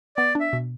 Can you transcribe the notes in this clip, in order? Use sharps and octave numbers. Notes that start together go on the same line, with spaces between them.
B3 D5
D4
E5
B2